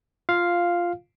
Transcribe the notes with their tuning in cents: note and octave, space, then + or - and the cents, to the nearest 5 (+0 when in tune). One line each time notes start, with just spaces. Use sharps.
F4 -5 F5 +0